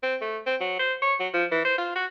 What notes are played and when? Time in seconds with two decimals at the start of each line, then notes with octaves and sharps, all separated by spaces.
0.03 C4
0.21 A3
0.46 C4
0.60 F#3
0.79 C5
1.02 C#5
1.20 F#3
1.33 F3
1.51 E3
1.65 C5
1.78 F4
1.95 F#4